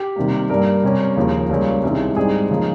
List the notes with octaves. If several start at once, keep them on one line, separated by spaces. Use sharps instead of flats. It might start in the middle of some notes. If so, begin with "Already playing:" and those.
Already playing: G4
C3 D#3 G3 A#3
G2 G3 A#3 A#4
C3 G3 C#4
D#2 C#3 F3 A#3
C#2 C#3 G3 A#3 C#4
C2 C3 D#3 G#3 C#4
G#2 G3 C4 D#4 G#4
C#3 F3 A#3 D#4